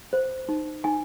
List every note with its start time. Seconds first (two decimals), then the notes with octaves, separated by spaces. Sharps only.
0.13 C5
0.49 D#4
0.84 D#4 G#5